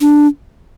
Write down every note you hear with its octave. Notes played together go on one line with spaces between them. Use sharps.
D4